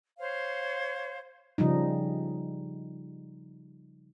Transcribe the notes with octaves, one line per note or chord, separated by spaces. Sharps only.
C5 C#5 F5
C#3 F3 G3 D#4